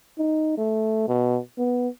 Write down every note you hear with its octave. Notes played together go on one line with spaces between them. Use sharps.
D#4
A3
B2
B3